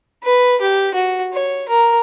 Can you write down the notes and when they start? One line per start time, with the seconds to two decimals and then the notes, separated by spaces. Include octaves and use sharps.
0.24 B4
0.61 G4
0.94 F#4
1.33 C#5
1.69 A#4